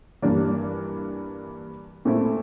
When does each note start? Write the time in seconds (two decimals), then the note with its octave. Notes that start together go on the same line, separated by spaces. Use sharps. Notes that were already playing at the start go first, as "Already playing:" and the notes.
0.22 G2 E3 A#3 D4
2.05 A#2 A3 C4 E4